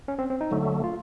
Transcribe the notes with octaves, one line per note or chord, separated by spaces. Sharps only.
C#4
C4
C4
D#4
D3 F#3 A3
F4